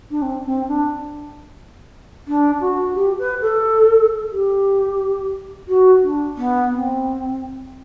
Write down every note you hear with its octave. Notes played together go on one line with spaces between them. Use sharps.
D4
C4
C4
D4
D4
F#4
G4
B4
A4
G4
F#4
D4
B3
C4